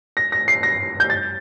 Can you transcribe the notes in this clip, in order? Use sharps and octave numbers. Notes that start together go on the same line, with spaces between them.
A#6
A#6
C7
A#6
G6
A6